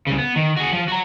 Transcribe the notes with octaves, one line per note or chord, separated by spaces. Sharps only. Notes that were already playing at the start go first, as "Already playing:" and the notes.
C2 C#3
B3
D#3
F#4 G#4
F3
F#4 A#5